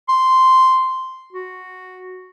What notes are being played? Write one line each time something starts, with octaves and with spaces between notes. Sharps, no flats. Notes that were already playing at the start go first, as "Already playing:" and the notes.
C6
F#4